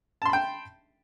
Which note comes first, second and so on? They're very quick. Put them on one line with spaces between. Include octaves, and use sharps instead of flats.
A5 C6 B5 G5